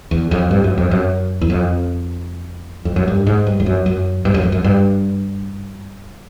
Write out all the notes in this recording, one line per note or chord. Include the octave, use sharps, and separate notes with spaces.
E2
F2
G2
F#2
F2
F#2
E2
F2
F2
F#2
G2
G#2
G2
F2
F#2
F#2
G2
F#2
F2
F#2
G2